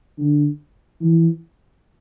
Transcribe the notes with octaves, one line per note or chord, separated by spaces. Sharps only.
D3
E3